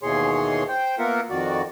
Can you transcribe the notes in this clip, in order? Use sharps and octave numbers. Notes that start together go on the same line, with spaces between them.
D#2 B2 E3 G#4 C#5 C6
C5 G5
A#3 B3 F4 A#4 E5 F#5
F2 D#3 F#4 D5